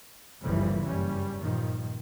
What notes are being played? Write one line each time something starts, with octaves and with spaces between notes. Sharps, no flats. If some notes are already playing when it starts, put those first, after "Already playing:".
G1 D#2 C#3 E3 F3 G3
F#1 G2 G3 C#4
G2 A#2 D#3 F3